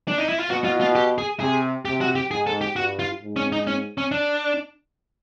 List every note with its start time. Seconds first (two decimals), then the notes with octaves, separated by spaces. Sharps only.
0.08 D4
0.18 D#4
0.29 E4
0.39 F4
0.50 B2 F#4
0.64 F4
0.81 F4
0.95 G4
1.18 G#4
1.40 C3 G#4
1.85 C3 G4
2.01 F#4
2.15 G4
2.31 G#2 G#4
2.47 A4
2.61 G4
2.76 G2 F#4
2.99 F4
3.22 G#2
3.36 C#4
3.52 D#4
3.67 C#4
3.98 C#4
4.12 D4